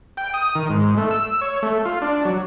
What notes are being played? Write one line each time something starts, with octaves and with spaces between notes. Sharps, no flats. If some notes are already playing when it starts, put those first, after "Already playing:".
G5
D#6
D#3
G#2
A3
E6
C#5
A3
F4
D4
F#3